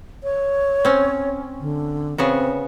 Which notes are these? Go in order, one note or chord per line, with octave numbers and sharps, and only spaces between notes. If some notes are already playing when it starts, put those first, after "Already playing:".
C#5
C4 C#4
D3
C#3 B3 C4 F#4